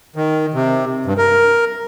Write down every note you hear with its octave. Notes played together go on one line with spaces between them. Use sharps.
D#3
C3
G2
A#4